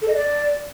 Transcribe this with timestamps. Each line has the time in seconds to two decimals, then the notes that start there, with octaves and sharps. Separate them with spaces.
0.02 A4
0.08 D#5
0.14 D5